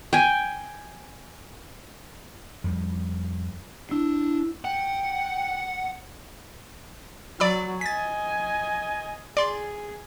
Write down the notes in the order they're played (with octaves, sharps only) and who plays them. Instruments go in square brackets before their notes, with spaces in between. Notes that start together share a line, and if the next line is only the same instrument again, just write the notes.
[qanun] G5 G#5
[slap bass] F2 G3
[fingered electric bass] D4 [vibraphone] E4
[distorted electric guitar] F#5 [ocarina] G5
[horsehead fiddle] F#3 [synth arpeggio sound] D5 B5 E6
[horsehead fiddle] D#5 G#5 [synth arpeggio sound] A6 B6
[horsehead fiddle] G#4 [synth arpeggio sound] D5 C6